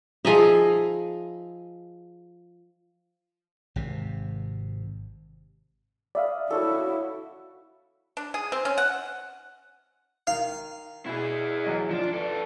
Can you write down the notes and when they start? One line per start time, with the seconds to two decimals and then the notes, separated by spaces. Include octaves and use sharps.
0.25 F3 D#4 G#4 D#5 E5
3.76 G#1 C3
6.15 D5 E5 F5 B5 D#6
6.50 E4 F#4 A4 C#5
8.17 D4
8.34 G#4
8.52 C4
8.65 C#4
8.78 F#5
10.27 D#3 F5
11.06 B2 E4 G#4
11.64 E2 F#3 D#5
11.91 F3 D4
12.14 B3 A4 D5